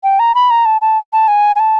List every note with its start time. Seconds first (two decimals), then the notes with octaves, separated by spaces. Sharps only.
0.04 G5
0.19 A#5
0.35 B5
0.50 A#5
0.65 A5
0.81 A5
1.13 A5
1.28 G#5
1.56 G#5
1.60 A5